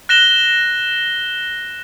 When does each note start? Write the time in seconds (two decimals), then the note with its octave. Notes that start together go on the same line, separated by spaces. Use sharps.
0.09 F#6 A#6 E7 G7